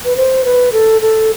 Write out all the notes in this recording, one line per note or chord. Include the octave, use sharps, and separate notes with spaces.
B4
C5
B4
A4
A4